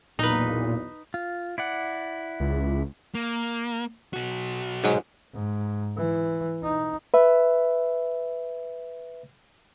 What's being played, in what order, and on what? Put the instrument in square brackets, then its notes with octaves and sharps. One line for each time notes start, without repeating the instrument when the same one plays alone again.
[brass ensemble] B1 E2 [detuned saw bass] A#2 [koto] D#4 B4
[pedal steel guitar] F4
E4 D5 F#5
[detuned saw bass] C#2
[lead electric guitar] A#3
B1 F#4
[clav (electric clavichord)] G#2 F#3 G#3
[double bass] G#2
E3
D#4
[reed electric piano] B4 E5